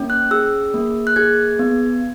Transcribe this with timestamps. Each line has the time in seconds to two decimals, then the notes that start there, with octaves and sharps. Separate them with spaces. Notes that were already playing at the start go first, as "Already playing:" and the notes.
Already playing: A#3 C#4
0.10 F#6
0.31 G#4 E6
0.74 A#3
1.07 F#6
1.16 G#4 G#6
1.59 B3